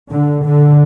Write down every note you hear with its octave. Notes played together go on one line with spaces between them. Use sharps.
D3
D3